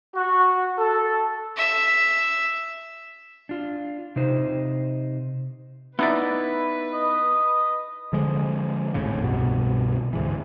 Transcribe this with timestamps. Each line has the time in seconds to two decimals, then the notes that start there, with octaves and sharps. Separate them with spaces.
0.15 F#4
0.78 A4
1.57 E5
3.49 D4 F4
4.16 C3 D#4 C5
5.99 B3 D#4 E4 B4 D5 E5
6.93 D#5
8.13 D3 F3 G#3
8.94 G#1 D#2 A2 C#3
9.24 C2 G2 B2 B3
10.13 D2 G#2 E3